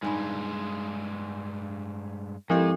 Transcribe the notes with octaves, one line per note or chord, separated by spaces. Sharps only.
G2 G#3 D#4 G#5 B5
G#2 F3 C4 E4 G4 A4 D#5